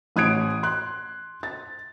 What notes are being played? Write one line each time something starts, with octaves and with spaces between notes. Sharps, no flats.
A1 D#6 F#6 G#6 D7
C6 F#6
A6